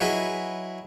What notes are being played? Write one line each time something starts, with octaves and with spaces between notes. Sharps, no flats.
F#3 E4 G#4 B4 D#5